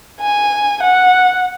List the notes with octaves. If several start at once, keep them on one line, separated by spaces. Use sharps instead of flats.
G#5
F#5